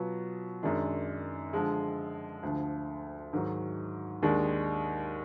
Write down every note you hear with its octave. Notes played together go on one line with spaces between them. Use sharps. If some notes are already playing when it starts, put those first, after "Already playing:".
Already playing: B2 F#3 B3 F4
F#2 D#3 G#3 D4
D3 F3 G#3
D2 D3 F3
G#2 D#3 F#3
D#2 D#3 G#3 D4